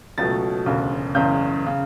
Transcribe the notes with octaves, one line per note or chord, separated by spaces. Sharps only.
C#2 B2 F#3 A3 A6
E1 D2 C#3
F#1 E2 C#3 G6
C#3